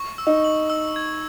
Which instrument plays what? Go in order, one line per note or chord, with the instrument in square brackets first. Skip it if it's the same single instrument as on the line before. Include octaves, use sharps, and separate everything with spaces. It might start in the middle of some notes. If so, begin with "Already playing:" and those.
Already playing: [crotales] C#6
E6
[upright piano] D#4
[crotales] F#7
E6
G#6